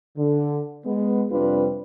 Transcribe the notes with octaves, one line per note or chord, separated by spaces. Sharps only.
D3
G#3 B3
F2 C3 G3 D4 F4 B4